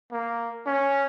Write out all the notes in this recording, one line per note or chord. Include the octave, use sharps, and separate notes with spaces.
A#3
C#4